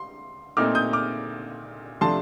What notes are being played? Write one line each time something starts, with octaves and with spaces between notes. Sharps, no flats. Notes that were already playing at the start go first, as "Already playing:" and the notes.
Already playing: C6
A#2 A3 C4 D#4 D6 F6
D#6 G6
D6 F6
C3 F3 A3 D4 A5 C6